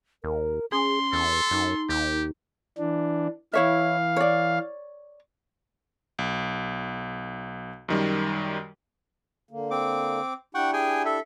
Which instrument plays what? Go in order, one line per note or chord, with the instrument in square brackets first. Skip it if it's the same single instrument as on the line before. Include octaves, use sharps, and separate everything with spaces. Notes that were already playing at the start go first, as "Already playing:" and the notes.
[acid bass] D#2 [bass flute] A#4
[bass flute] C#4 [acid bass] G#4 [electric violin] C6
[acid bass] E2 [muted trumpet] A4
[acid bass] F#2 [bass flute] D#4
[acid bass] D#2 [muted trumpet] G4
[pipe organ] E3 D4
[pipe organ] E3 F5 [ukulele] E4 C#5 E5
[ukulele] C#5 D5
[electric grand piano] B1
F#2 D#3 G3
[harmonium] D3 A#3
[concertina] C4 D6
[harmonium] D4 E4 G4 [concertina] F#5 G5 C#6
[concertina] G#4 G5 G#5
A4 E5